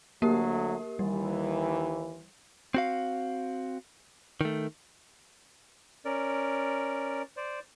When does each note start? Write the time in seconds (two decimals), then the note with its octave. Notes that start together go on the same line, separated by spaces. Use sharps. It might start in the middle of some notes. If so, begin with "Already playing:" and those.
0.22 D2 F#3 A3 A#3 G4 A#4
0.99 D#2 E3 G3
2.74 C4 F#4 F5
4.41 D#3 A3
6.05 C#4 A#4 D5
7.37 C5 D5